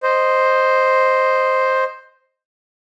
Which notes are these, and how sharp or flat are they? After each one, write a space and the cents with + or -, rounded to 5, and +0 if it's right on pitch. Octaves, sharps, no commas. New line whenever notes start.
C5 +0 D#5 -5